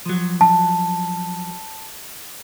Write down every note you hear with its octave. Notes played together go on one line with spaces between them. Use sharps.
F3 F#3
A5